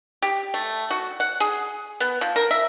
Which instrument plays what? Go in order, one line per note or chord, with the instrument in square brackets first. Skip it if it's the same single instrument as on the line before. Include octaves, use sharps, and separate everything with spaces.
[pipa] G4
A3
F#4
F#5
G#4
B3
F3
A#4
E5